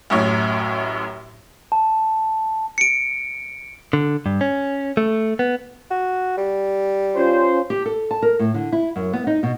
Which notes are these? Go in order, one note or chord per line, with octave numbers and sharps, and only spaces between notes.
A1 F#2 A2 C#5
A5
C#7 D7
D3
G2
C#4
A3
B3
F#4
G3
C#4 F4 C5
G4
A4
A5
A#4
A2
D3
E4
F#2
B3
D#4
B2